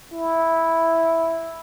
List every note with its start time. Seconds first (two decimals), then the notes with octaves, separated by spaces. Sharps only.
0.13 E4